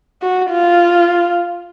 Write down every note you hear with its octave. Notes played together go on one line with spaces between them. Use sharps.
F#4
F4